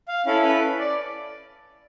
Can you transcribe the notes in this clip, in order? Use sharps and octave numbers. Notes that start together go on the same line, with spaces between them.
F5
C#4 E4 A4 F5
B4
D5